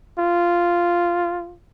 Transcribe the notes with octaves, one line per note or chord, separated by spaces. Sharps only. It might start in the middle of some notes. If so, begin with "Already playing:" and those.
F4